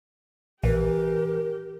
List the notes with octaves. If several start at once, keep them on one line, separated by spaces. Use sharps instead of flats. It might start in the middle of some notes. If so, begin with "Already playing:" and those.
A#1 E3 G4 A#4